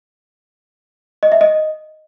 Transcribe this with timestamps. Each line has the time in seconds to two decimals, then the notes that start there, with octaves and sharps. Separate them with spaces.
1.23 D#5
1.32 E5
1.41 D#5